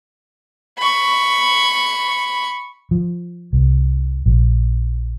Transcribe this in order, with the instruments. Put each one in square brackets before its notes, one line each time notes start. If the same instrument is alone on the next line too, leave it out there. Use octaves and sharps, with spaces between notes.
[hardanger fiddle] B5 C#6
[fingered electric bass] F3
C2
A#1